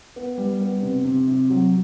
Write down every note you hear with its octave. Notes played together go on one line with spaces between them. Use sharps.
B3
G3
B3
C3
C3
C3
F#3